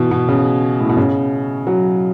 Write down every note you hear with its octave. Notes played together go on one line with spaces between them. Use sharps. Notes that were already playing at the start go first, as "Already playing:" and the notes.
Already playing: B2 E3
B2
C#3
A2
B2
C#3
F#3